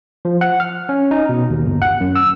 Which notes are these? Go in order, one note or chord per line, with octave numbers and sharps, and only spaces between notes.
F3
F#5
F6
C#4
D#4
B2
D#2
G1
F#5
F#2
E6